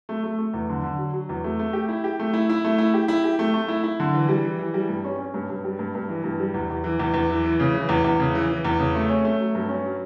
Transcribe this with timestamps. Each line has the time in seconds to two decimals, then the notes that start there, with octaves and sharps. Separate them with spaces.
0.09 A3
0.23 A3
0.38 A3
0.54 E2
0.69 D3
0.83 D3
0.98 F#3
1.13 F#3
1.29 E2
1.44 A3
1.59 A3
1.73 G4
1.88 E4
2.04 G4
2.19 A3
2.33 E4
2.49 E4
2.64 A3
2.78 E4
2.94 G4
3.08 E4
3.24 G4
3.39 A3
3.54 A3
3.68 E4
3.83 E4
4.00 D3
4.14 E3
4.29 G3
4.45 E3
4.59 E3
4.74 G3
4.89 G2
5.04 C#4
5.19 C#4
5.34 G2
5.50 G2
5.64 G3
5.79 G2
5.95 G2
6.09 E3
6.24 G2
6.39 G3
6.54 E2
6.70 E2
6.84 E3
7.00 E2
7.14 E2
7.30 E3
7.44 E3
7.60 C#3
7.74 E3
7.89 E2
8.04 E2
8.20 C#3
8.35 E3
8.49 E3
8.65 E2
8.79 C#3
8.95 A3
9.09 C#4
9.25 A3
9.40 F#3
9.55 G2
9.69 C#4
9.85 F#3